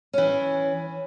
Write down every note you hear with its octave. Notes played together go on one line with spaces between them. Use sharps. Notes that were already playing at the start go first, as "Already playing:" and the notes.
E3 C#4